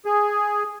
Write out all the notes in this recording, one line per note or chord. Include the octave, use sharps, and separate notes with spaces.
G#4